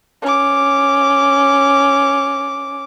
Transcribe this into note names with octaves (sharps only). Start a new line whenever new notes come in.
C#4 D6